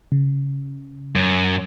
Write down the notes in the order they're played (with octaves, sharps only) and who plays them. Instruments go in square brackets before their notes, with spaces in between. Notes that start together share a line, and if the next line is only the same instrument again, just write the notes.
[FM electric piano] C#3
[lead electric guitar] F#2